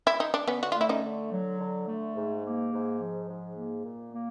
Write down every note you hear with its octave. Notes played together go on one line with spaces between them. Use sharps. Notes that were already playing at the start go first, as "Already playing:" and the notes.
E4
D#4
D4
D3 B3 C#4
F#4
A3 F4
E4
C#4 D#4
D3
F#3
D3
A3
G#2
A#3
G#2
F3
G#2
A#3
A#2
A#3